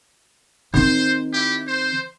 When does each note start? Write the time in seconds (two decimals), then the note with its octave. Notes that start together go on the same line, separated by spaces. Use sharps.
0.74 D#3 C4 C5
1.33 E4 G4
1.67 C5